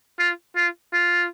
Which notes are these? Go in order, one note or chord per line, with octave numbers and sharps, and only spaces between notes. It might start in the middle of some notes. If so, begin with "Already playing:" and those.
F4
F4
F4